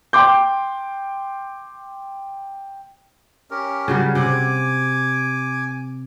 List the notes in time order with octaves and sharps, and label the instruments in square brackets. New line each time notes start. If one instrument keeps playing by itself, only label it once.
[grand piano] G5 C6 D6 G6
[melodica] C#4 G4 A#4
[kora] C#3 F#3 G3
[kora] C3 F#5 [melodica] G#5 D6